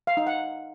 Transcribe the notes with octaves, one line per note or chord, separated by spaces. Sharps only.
F5
D#4
F#5